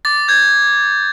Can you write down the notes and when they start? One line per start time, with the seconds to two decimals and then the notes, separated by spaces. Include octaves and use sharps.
0.05 D6 A6
0.28 G6 G#6